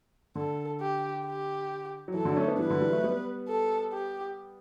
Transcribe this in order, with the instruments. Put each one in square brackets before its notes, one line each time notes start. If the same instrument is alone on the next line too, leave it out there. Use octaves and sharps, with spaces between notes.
[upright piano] D3 [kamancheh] A4
[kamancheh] G4
G4
[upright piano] F#3
[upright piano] E3 [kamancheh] A4
[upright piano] D3 F#3
D4
A3 C#4
B3 D4
[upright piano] E3 G3 [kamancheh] B4
[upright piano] D3 F#3
E3 G3
F#3 A3
G3 B3
[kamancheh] A4
G4